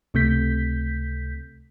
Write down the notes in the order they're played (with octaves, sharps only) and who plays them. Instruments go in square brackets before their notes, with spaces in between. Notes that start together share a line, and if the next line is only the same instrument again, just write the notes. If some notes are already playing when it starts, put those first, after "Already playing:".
[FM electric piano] C#2 C3 A3 G6 B6